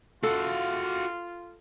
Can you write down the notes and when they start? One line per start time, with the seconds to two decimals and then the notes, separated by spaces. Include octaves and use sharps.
0.23 F4 F#4 A4 F5